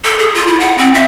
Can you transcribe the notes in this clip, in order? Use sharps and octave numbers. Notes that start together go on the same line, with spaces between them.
A4
G#4
F4
E4
F#5
C4
E5